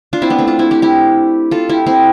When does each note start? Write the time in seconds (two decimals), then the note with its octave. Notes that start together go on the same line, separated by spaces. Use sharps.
0.13 D4 F4
0.22 C4 E4
0.30 B3 D4
0.38 A3 C4
0.47 D4 F4
0.59 C4 E4
0.71 E4 G4
0.82 E4 G4
1.51 F4 A4
1.69 E4 G4
1.86 C4 E4